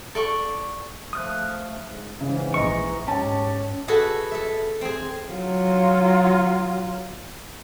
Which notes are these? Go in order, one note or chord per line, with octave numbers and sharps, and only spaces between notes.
A4 D5 C#6
F3 A3 D#6 F6 F#6
G#2
G#2 C#3 E3
A#1 D#5 A#5 C#6
G#2 C#4 G4 A5
F#4 G#4 A4 B4
A4 E5
C4 G#4
F#3 F4